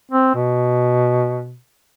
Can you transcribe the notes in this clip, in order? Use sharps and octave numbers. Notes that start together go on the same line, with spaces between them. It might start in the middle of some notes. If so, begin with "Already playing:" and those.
C4
B2